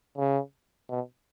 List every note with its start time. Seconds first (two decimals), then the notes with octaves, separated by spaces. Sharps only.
0.17 C#3
0.89 B2